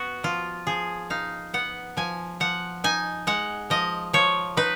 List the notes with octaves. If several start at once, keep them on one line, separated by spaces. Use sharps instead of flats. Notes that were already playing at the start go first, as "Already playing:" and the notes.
Already playing: B3 F#4
F3 F4
F3 G#4
D#4 F5
B3 F#5
F3 G#5
F3 F#5
D#4 G#5
G#3 F#5
F3 D#5
F3 C#5
D#4 B4